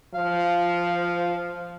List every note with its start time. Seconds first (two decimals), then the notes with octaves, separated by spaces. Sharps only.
0.14 F3 F5